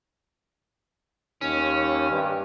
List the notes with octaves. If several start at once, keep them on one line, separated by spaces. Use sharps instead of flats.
D#2 C#4
G2